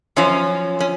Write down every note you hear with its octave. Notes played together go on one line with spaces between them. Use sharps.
F#2 F3 C#4
C#4